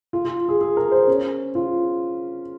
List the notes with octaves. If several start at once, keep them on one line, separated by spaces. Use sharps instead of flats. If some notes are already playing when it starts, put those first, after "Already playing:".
F4
F4
G#4
G#4
A#4
C5
C#4
F4